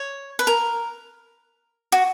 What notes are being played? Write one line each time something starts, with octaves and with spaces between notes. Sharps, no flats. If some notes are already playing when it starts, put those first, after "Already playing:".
Already playing: C#5
B4
A#4
F#4